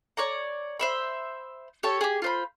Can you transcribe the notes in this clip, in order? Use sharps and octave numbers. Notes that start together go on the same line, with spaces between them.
C#5 D5 A#5
C5 E5 B5
G4 A4 C#5 A5
G4 G#4
F4 C5 B5